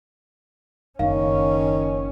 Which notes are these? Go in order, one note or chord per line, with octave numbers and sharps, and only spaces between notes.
F#1 D#3 C#4 F5